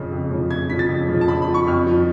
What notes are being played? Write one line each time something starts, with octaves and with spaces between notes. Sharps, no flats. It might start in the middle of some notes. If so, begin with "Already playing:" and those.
Already playing: F2 C#3 F3
F2
C#3 F3
F2 G#6
C#3 F3 B6
A6
F2
C#3 F3
A5
F2 B5
B5
F3
C#6
F2 F6
F3